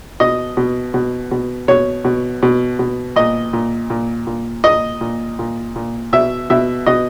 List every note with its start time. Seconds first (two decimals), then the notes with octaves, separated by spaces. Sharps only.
0.20 B2 D#5
0.57 B2
0.94 B2
1.31 B2
1.68 B2 C#5
2.05 B2
2.43 B2
2.79 B2
3.16 A#2 D#5
3.53 A#2
3.90 A#2
4.27 A#2
4.64 A#2 D#5
5.01 A#2
5.39 A#2
5.76 A#2
6.13 B2 E5
6.50 B2 E5
6.86 B2 D#5